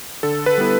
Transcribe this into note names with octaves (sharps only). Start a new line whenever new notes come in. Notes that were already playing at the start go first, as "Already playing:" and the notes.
D3 A4
B4
G3 B3 E4